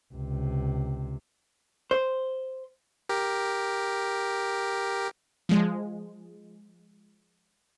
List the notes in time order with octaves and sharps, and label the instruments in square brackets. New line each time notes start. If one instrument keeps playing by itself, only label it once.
[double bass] C#2 C3
[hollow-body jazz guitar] C5
[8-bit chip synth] G4 A#4
[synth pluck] F3 G#3